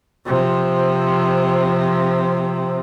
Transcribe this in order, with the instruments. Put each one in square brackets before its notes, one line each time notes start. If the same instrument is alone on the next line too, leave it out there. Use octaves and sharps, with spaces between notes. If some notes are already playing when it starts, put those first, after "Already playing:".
[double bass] C3 F3